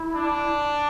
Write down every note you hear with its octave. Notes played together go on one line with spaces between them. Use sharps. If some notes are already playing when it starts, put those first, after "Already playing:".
Already playing: E4
D4